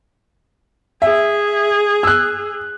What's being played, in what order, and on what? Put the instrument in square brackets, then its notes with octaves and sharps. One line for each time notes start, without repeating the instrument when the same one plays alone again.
[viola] G#4 [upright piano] E5
[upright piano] E6 F#6